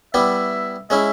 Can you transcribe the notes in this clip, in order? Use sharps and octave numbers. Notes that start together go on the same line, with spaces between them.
G3 B3 E4 G4 E5
G#3 C#4 E4 E5